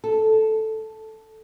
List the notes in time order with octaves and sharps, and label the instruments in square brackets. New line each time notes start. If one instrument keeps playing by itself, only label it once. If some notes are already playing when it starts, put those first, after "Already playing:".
[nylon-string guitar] A4